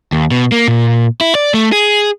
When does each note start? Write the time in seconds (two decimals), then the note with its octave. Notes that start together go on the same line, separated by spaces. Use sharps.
0.12 D#2
0.31 B2
0.52 A#3
0.68 A#2
1.21 E4
1.35 D5
1.54 A3
1.72 G#4